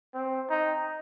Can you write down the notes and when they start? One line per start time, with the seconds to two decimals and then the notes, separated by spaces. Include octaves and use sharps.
0.14 C4
0.50 D#4